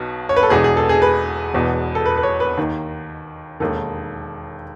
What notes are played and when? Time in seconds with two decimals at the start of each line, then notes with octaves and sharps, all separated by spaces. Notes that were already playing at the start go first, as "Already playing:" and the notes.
Already playing: B1 B2
0.29 C#5
0.36 B4
0.43 A4
0.50 E1 E2 B2 G#4
0.64 G#4
0.77 A4
0.89 G#4
1.02 B4
1.54 E1 E2 B2
1.95 A4
2.06 B4
2.17 B4
2.23 C#5
2.40 B4
2.58 D#2 D#3
3.60 E1 D#2 D#3 A4